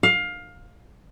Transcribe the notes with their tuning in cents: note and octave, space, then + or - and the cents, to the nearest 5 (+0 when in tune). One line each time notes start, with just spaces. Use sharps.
F5 +20